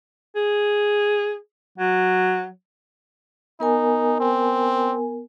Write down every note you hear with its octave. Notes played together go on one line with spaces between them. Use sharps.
G#4
F#3
B3 D#4 A#4 G#5
C4